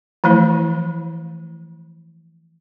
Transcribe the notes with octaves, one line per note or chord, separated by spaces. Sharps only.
E3 F3 A3 E4 C5